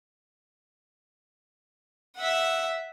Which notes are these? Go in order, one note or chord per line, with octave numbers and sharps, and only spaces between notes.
E5 F#5